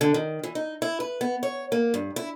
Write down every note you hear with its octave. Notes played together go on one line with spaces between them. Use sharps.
D3
D#3
E3
D#4
E4
B4
B3
C#5
A#3
G2
E4